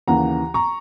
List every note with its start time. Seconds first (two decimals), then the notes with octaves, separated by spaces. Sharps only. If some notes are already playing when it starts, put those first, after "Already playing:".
0.08 D#2 C#3 E3 F#5 A#5
0.54 A#5 C#6